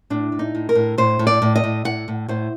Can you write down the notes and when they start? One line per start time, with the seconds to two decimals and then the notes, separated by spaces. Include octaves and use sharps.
0.10 A2 D4
0.32 A2
0.39 D#4
0.55 A2
0.69 A#4
0.75 A2
0.98 A2 C5
1.19 A2
1.27 D5
1.42 A2
1.56 D#5
1.64 A2
1.85 A2 F#5
2.08 A2
2.28 A2 C5